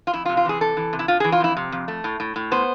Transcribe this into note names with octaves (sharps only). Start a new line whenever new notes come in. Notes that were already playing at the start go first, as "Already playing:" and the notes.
F4
F2 E4
F4
C3
F4
E3 G#4
C3 A4
E3
C3
E4
C3 F4
G#4
E3
F4
F2 E4
C3
F2
A3
A2
A2
A2
B3 C5